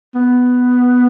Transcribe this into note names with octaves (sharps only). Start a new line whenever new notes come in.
B3